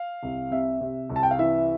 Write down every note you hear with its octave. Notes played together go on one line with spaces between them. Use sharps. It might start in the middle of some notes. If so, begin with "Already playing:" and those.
Already playing: F5
C2
C3 E5
C3
C2
A5
G5
F5
E3 E5